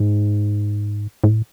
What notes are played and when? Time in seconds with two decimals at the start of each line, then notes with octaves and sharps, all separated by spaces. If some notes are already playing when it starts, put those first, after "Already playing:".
Already playing: G#2
1.24 A2